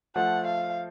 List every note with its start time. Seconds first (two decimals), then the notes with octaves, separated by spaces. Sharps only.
0.16 F3 A3 F#5
0.47 F5